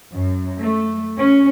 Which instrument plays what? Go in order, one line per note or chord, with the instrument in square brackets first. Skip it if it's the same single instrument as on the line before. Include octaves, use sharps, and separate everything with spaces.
[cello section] F#2
A3
C#4